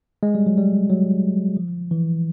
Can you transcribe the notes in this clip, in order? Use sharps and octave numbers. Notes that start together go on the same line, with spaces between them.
G#3
G3
F#3
G3
F#3
F3
E3